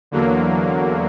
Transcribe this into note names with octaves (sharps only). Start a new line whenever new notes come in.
E2 D3 F#3 A#3